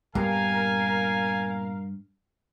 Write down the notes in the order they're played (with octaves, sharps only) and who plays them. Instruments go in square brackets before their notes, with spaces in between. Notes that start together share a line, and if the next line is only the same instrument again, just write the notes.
[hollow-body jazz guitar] G2 [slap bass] A#2 B3 [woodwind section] A#4 F5 [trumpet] G#5